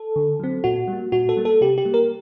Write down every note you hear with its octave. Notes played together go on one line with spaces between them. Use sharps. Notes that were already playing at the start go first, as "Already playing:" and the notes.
Already playing: A4
D3
F#3 C4
A#2 F#4
G3 A#3
A#2 F#4
A4
G3 A#3
A4
C3 G4
G4
G3 A#3
A#4